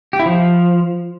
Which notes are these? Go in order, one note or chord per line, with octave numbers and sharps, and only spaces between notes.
G4
E4
F3